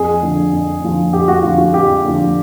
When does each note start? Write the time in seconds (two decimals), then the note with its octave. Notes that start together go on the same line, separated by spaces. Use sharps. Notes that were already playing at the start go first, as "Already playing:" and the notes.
Already playing: F2 G#4
0.22 D3 F3
0.52 F2
0.82 D3 F3
1.13 F2 G4
1.28 F#4
1.43 D3 F3 F4
1.58 F#4
1.74 F2 G4
2.04 D3 F3